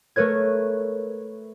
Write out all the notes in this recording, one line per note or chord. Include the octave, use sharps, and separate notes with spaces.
A3 A#4 B4 C#5 G#6